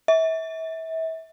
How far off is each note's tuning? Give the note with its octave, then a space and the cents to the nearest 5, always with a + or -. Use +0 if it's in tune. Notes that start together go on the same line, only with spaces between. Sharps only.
E5 -30